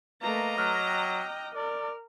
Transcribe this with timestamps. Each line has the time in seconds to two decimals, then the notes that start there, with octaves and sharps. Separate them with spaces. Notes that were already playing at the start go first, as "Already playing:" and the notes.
0.22 A3 A#3 B4 D#5 A#5
0.57 F#3 D6 F6 F#6
0.86 G5
1.55 A#4 D5